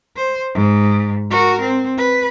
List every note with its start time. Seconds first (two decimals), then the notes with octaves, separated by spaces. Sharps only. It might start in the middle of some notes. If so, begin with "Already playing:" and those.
0.16 C5
0.54 G#2
1.31 F#4 A#4
1.61 C4
1.98 B4